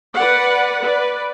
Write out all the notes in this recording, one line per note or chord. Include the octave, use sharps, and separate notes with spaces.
B4 D5 F#5
B4 D5